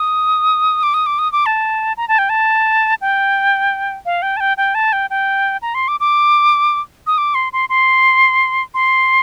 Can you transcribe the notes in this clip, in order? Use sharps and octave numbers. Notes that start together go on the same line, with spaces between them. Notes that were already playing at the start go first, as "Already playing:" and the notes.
Already playing: D#6
D6
D#6
D6
D#6
D6
A5
A#5
A5
G5
A5
G5
F5
G5
A5
G5
G5
A5
G5
G5
A#5
C6
D6
D6
D#6
D6
C6
C6
C6
C6